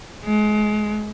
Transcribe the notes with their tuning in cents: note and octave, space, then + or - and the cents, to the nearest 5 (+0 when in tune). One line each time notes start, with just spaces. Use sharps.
G#3 +30